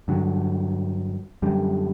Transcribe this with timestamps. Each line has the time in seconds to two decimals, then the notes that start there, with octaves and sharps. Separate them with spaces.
0.08 G2 D3 F#3
1.42 F#2 D3 G3